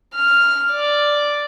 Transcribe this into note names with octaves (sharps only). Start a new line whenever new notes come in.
F6
D5